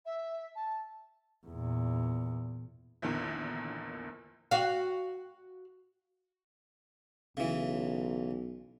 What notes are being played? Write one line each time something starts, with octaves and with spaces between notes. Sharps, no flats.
E5
A5
E2 A#2
A#1 E2 D3 D#3
F#4 F5
B1 C#3 E3